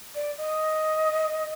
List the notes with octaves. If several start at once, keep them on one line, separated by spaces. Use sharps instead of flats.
D5
D#5